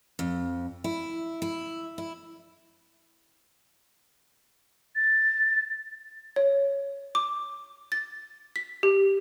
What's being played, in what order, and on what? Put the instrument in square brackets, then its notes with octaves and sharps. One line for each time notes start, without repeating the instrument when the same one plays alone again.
[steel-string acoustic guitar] F2
E4
E4
E4
[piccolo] A6
[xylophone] C#5
D6
A6
B6
G4